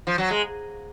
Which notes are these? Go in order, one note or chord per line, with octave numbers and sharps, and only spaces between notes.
F3
F#3
G#3